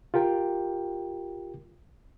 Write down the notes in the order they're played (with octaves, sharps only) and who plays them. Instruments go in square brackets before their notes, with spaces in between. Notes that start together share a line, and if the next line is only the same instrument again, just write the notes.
[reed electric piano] F4 G4 A#4 G5